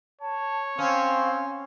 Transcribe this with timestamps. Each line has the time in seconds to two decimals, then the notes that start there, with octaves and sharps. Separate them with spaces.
0.21 C#5 A5
0.79 C4 C#4 F5